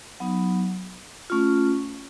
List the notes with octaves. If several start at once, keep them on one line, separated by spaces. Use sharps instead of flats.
F#3 B3 D#4
A3 C#4 F4